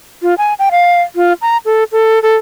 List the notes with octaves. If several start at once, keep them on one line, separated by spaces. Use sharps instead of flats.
F4
G#5
G5
F5
F4
A#5
A4
A4
A4